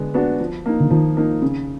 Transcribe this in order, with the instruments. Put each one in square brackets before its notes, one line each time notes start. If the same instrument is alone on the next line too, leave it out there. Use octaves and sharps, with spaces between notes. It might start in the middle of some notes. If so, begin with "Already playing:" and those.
Already playing: [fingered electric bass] D3 [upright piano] G#3 B3 D4
[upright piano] B3 D4 F#4
F3
A#3 D#4
[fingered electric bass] D3
[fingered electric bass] D#3 [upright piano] F3
[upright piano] A#3 D#4
C#3